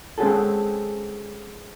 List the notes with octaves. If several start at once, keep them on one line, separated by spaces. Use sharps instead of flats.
G#3 C4 C#4 F#4 G#4 A4